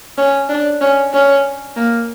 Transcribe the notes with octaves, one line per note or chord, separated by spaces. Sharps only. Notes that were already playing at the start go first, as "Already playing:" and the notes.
C#4
D4
C#4
C#4
A#3